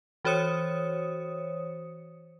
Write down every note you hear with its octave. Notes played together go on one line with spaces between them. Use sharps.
E3 F#4 C5 C#5 D#6 C#7